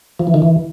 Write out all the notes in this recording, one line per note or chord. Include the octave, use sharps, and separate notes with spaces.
F3
E3
D#3
E3